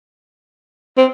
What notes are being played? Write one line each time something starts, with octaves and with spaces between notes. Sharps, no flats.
C4